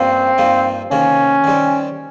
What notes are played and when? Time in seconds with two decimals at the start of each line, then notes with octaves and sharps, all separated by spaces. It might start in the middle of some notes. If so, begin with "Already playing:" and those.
Already playing: G2 F3 A#3 C4 C#4
0.38 G2 F3 A#3 D#4
0.91 C3 D#3 A#3 C#4
1.44 D#3 G3 C4